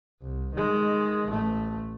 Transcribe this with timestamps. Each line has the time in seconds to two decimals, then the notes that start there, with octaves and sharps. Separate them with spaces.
0.22 C2
0.54 D#3 G#3
1.28 A1 A3